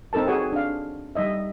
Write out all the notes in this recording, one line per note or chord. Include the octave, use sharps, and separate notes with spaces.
C4 D#4 A4 A#4 A5
F#4 G#4 A4 C#5 F#5 G#5
D4 F5
G3 D#4 D#5 E5